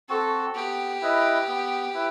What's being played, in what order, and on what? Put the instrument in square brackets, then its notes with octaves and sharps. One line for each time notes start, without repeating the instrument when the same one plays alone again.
[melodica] C4 F#4 [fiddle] A4
[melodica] B3 [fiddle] G4
[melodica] E4 B4 D#5
B3
E4 B4